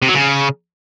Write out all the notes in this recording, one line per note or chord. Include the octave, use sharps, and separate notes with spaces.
C3
F#3
C#3